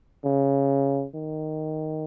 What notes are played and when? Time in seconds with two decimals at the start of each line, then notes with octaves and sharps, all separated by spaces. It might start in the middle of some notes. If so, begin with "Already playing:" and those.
0.25 C#3
1.15 D#3